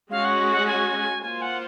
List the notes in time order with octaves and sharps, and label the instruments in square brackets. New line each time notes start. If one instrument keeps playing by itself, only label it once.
[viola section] G#3 C#4 F#4 [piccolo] F5
[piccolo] F#5
F#5
G#5
[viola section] A#3 F4 C5 [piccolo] G#5
[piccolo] F#5